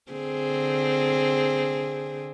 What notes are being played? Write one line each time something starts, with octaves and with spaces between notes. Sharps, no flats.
D3 C4 G#4